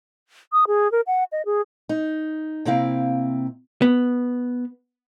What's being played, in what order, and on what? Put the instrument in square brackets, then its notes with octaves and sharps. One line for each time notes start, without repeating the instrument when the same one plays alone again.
[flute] D#6
G#4
A#4
F#5
D#5
G#4
[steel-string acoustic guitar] D#4
C3 A#3 C4 E4 F5
[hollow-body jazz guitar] B3